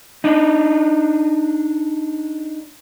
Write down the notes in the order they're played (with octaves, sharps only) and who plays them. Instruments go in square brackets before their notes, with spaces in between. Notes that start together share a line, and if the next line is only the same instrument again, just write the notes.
[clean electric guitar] D4 D#4